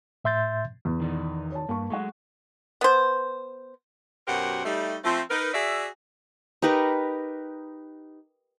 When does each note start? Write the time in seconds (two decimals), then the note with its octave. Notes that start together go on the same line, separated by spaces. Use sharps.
0.25 A2 E5 C6 G6 A6
0.85 E2
1.00 D#3 D#4 D5
1.52 C#5 A5
1.69 G2 A#3 A5 C#6
1.90 F#3 G#3 A3 F#5 C#6
2.81 B3 C5
4.27 F#2 B2 G4 A#4 C5 F#5
4.65 G3 A3 D#4
5.04 F3 A3 C4
5.30 D#4 A#4 B4
5.53 F#4 G#4 D5 E5
6.62 D#4 G4 A#4 B4